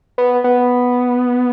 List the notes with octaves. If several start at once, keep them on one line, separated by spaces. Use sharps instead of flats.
B3
B3